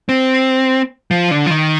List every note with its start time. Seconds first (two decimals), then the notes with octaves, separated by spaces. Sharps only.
0.09 C4
1.11 F3
1.31 D3
1.46 F3
1.50 D#3